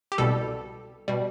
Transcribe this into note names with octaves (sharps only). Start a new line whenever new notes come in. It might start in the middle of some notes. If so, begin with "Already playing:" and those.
G4
C2 B2 G3 A4
B2 G3